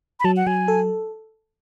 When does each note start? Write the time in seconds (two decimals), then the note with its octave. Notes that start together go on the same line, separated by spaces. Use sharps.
0.20 B5
0.24 F#3 A5
0.37 F#5
0.47 F#3 G#5
0.68 A4